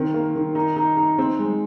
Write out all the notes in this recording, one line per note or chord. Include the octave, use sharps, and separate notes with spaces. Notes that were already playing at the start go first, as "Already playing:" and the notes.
Already playing: D#3 C4
A#3
D#3
D#4
D#4
D#4
C4
G#3